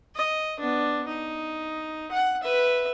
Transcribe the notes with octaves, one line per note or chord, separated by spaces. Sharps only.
D#5
B3 D4
D#4
F#5
B4 E5